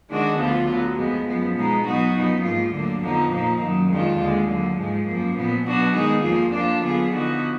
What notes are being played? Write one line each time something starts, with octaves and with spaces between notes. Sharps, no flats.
D#3 G#3 D4 F#4
D2 D3 F3 B3 F4
D3 F#3 B3
F2 F3 G#3 B3
F#2 F3 B3
B2 G#3 B3 D#4
B2 F#3 B3 D#4 F#4
F#2 F3 B3 D#4
G#2 F3 A#3 F4
D2 D3 F#3 A#3 D4
F2 D3 F3 B3 D#4
A#2 F3 A#3 D#4
F#2 D#3 F#3
F2 D#3 G#3 D4 F4
D#2 D3 G#3
D3 F#3 A#3
G#2 F3 G#3
F#2 F3 A#3
A#2 F3 B3
B2 F#3 B3 D4 F#4
D#3 G#3 B3 D#4 G#4
F2 F3 A#3 F4
F2 F3 A#3 D4 F4
D3 F#3 B3 F4 G#4
D3 F3 B3 D#4 F#4